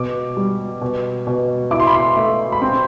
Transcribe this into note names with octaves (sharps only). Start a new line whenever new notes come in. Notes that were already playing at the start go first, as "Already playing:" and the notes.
Already playing: B2 D6
G3
B2
B2
E4 D6
C6
B5
C6
A3
B5
C4 C6